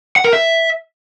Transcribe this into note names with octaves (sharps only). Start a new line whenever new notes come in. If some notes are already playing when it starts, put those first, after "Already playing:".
F#5
A#4
E5